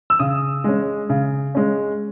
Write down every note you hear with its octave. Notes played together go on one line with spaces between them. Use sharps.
E6
C#3 D#6
G#3 C#4
C#3
G#3 C#4